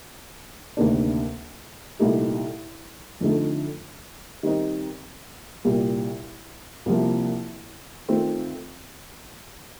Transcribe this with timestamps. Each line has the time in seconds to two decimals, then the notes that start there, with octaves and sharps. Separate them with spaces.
0.77 D2 C3 D#3 A#3 D4
1.99 C2 A#2 A3 D#4 G4
3.21 F2 D3 A3 D#4
4.43 D#3 G3 C4 D#4
5.65 C2 A#2 G3
6.86 C2 C3 F3 A#3
8.08 D#3 A3 C4 F4